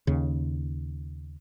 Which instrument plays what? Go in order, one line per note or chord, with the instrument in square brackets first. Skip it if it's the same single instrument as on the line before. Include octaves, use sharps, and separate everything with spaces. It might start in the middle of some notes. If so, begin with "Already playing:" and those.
[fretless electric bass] D#2 C#3